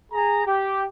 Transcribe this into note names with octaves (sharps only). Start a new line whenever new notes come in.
G#4 A#5
G4